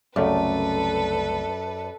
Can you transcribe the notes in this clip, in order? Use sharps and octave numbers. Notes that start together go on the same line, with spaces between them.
C2 F#2 C#3 A3 A4 B4 D5